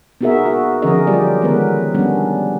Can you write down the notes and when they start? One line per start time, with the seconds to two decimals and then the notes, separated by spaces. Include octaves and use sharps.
0.21 B3 D#4 F#4 G#4 A#4 E5
0.46 F#4 A#4
0.82 D3 F3 C#4 G#4 A#4 D#5
1.07 D3 F#3 G3 F4 G4 D5
1.42 D#3 F#3 G#3 B3 A#4 B4
1.94 G3 B3 C#4 D4